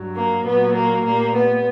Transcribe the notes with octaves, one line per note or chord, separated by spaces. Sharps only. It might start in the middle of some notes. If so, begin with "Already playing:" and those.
Already playing: G2 F#3
A#3
A#2 F#3 B3
A#3
A#2 G3 A#3
B3